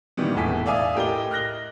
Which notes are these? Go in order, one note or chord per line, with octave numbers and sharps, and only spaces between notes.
A#2 D#3 E3 G3 B3
E1 A2 G#5 B6
D5 E5 F5 G#5 D#6
A2 G4 A#4 D#5 G7
F6 F#6 A#6 G7